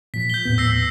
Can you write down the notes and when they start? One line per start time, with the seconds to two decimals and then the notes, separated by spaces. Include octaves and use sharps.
0.14 A#2 F3 B6
0.30 G6 G7
0.45 D#2 A2 B3
0.58 E6 A#6 C7